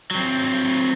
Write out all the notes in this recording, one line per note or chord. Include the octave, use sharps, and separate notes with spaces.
F#3 C4